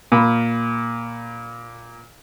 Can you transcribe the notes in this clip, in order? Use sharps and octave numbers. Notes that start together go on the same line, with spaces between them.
A#2 B5